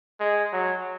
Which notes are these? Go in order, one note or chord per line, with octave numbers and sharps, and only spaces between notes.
G#3
F#3